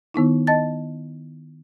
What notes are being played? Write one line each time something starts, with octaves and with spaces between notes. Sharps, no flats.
D#3 B3 D#4 E4
D#5 A5 A6